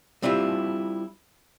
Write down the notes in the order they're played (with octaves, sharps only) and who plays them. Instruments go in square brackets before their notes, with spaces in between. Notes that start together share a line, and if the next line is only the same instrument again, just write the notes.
[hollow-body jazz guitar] G3 C4 D4 E4 F4